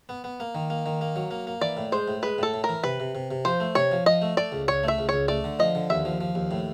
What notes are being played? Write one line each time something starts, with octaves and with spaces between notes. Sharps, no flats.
B3
B3
A#3
D#3
A#3
D#3
A#3
F#3
A#3
A#3
E3 D5
A2
G#3 C5
A2
G#3 B4
A2 A4
A2
A#4
E3
C3 B4
C3
C3
C3
F3 C5
A3
C3 C#5
F3
F3 D#5
A3
A3 D5
C#2
C#2 C#5
A3 E5
C#2
C#2 C#5
A3 D5
D3
F3 D#5
D3
D#2 E5
F3
F3
D#2
A2